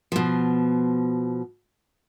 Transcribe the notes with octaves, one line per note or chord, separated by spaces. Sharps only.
B2 F3